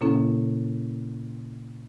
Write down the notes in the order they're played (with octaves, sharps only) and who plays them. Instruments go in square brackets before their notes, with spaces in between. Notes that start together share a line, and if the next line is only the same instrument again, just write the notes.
[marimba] A#2 C#3 A#3 C#4 E4 A4